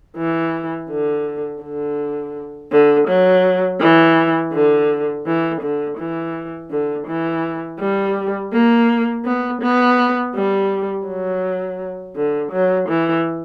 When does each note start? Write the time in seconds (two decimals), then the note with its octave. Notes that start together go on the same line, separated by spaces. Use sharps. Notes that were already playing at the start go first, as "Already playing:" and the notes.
0.17 E3
0.90 D3
1.62 D3
2.72 D3
3.07 F#3
3.80 E3
4.53 D3
5.26 E3
5.61 D3
5.98 E3
6.70 D3
7.07 E3
7.79 G3
8.53 A#3
9.25 B3
9.61 B3
10.35 G3
11.07 F#3
12.16 D3
12.52 F#3
12.88 E3